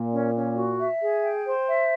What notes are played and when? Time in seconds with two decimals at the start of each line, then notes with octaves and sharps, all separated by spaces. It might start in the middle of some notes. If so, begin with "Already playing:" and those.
Already playing: A#2
0.13 C#4
0.34 C#4
0.57 F#4
0.80 E5
1.01 G#4
1.23 G5
1.45 C5
1.67 E5